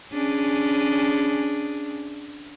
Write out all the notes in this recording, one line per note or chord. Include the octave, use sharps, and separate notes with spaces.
C#4 D4 G#4